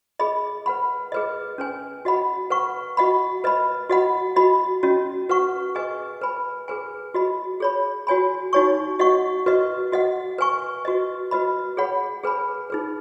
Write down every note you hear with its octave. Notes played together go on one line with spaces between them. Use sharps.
G#4 D#5 B5
B4 F#5 B5
G#4 B4 D#5
C#4 B4 G#5
F#4 D#5 F#5 B5
B4 F#5 C#6
F#4 D#5 F#5 B5
B4 D#5 B5
F#4 D#5 F#5 B5
F#4 D#5 B5
C#4 F#4 D#5
F#4 B4 F#5 C#6
G#4 B4 D#5 G#5
B4 G#5 B5
G#4 B4 G#5
F#4 D#5 B5
G#4 C#5 B5
F#4 C#5 G#5 B5
D#4 F#4 C#5 G#5 C#6
F#4 D#5 F#5 C#6
F#4 B4 D#5
F#4 D#5 F#5
B4 G#5 C#6
F#4 B4 D#5
F#4 B4 D#5 B5
G#4 C#5 F#5 B5
G#4 B4 G#5 B5
D#4 G#4 B4